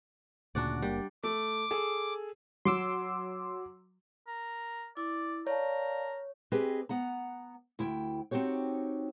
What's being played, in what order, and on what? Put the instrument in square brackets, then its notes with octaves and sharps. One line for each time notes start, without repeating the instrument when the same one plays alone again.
[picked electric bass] D2 A#2 C#3 [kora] D4 F#4 D5
[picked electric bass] F#1 A#3 [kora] G3
[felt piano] A3 [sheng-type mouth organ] D6
[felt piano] G#4 A4
[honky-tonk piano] F#3 [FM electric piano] C6 D6 E6
[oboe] A#4
[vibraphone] E4 [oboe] D5
[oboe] A#4 [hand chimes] C#5 [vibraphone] D5 F5 A5
[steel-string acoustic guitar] C4 G4 G#4 B4 D#5
B3 F#5 A#5
D2 E4 G5
C4 D#4 F#4 G4 C#5